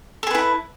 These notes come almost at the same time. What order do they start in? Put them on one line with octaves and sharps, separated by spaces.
A4 G#4 B4 E4